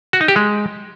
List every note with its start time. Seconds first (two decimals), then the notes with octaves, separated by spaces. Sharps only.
0.13 F#4
0.21 D#4
0.28 G4
0.36 G#3